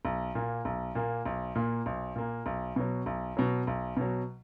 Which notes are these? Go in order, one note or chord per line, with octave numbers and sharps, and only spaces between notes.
B1
A#2 A#3
B1
A#2 A#3
B1
A#2 A#3
B1
A#2 A#3
B1
B2 F#3
B1
B2 F#3
B1
B2 F#3